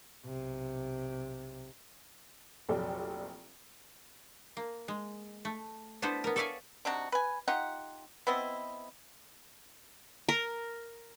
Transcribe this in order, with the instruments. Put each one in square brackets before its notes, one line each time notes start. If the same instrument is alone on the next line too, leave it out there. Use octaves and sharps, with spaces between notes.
[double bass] B1 C3
[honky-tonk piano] F1 A#1 F#3 A4 D5 G5
[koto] A#3
G#3
A3
B3 D4 E4 A4 B4 C5
B3 A#4
A4 C#5 D5 E5 F5 G#5
[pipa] C3 D4 D#4 F#4
B4 G#5
D#4 F4 G4 F#5
B3 C4 E4 D#5
[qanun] A#4